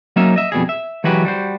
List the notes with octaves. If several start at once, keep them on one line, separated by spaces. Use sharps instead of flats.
F#3 A#3 C#4 D#4 A#4 E5
D#5 E5
F2 B2 G3 G#4
E5
E3 F#3 G#3 F#4 G4 B4
G3 F#4 C5